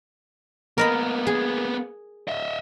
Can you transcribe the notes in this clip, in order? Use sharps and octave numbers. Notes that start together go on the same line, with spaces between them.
A#3 B3 A#4 D#5 B5
G#4
D#5 E5